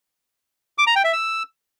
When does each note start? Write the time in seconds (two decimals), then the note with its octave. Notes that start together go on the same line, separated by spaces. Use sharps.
0.78 D6
0.87 A#5
0.96 G5
1.04 E5
1.13 E6